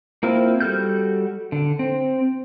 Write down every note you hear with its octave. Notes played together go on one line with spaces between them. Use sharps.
A#3 C4 E4 F4
G3 F#4 A4 F6 G6
D3
C4